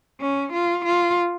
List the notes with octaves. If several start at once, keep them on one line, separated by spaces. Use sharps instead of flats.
C#4
F4
F4